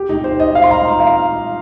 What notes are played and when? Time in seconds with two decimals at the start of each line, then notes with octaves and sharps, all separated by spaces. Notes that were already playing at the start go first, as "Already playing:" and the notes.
Already playing: G4
0.09 D#4
0.24 C5
0.40 D#5
0.55 F5
0.64 C6
0.71 A#5
0.85 A#5
1.00 F5